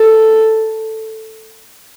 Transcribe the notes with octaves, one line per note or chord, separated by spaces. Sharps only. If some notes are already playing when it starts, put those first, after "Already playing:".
Already playing: A4